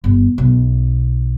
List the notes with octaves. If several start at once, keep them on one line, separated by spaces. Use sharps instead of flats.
G1
B1